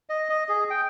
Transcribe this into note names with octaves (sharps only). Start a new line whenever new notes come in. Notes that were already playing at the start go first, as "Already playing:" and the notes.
D#5
D#5
G#4
G5